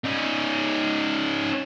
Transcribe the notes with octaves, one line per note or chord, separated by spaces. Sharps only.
C#4 D#4